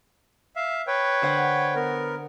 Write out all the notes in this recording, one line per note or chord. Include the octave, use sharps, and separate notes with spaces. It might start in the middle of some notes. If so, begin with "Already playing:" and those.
E5 F5
B4 C#5 G5
D3 C5 F#5
B3 A#4